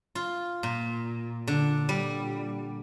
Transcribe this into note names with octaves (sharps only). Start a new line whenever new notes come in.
F4
A#2
D3
G3